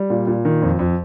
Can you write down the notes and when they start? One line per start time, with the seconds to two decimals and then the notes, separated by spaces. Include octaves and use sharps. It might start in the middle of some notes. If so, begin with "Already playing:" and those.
Already playing: G3
0.10 A#2
0.27 A#2
0.45 D#3
0.62 F2
0.79 F2